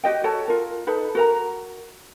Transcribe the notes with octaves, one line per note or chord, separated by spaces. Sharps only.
F#4 G4 D#5 G5
F#4 A4 C#5 A5
F4 A#4
D#4 A4 B4
F#4 A#4 A#5